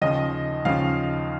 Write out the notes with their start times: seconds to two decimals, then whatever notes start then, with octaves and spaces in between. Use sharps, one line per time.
0.01 D#2 C#3 F3 D#5
0.65 D#2 C#3 F3 F5